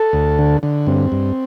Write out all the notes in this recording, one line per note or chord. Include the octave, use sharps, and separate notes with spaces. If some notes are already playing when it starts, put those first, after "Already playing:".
Already playing: A4
D2
D3
D3
G2 C4
G2